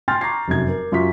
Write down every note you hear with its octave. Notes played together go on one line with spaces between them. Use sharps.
G5 G#5 C6 F6 G6 A6
A#5 C#6 D6 G#6 C7
F1 F#2 G#6
A#4
F#2 F4 C#6 B6